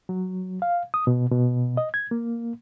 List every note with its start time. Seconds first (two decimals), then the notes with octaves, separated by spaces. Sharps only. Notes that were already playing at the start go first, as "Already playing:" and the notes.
0.09 F#3
0.62 F5
0.94 D#6
1.07 B2
1.32 B2
1.77 D#5
1.94 G#6
2.11 A#3